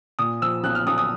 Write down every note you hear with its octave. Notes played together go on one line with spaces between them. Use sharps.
A#2 D#6
F3 E6
B1 F#6
F6
B1 D#6
D#6